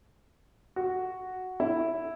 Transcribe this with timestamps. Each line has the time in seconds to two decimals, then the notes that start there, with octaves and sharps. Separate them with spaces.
0.76 F#4
1.60 E4